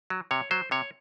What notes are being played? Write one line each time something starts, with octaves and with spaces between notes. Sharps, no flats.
F#3
C3 C#5
F#3 C5
C3 C#5